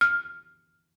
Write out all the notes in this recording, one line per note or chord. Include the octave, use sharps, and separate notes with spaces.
F6